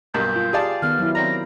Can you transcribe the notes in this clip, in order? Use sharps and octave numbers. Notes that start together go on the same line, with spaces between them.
B1 G2 A#3 G6
F4
G4 G#4 D5 F5 A5
D#3 B3 F6
F#3 E4
C4 D5 A#5 A#6